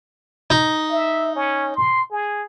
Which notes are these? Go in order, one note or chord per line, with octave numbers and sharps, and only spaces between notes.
D#4
E5
C#4
C6
G#4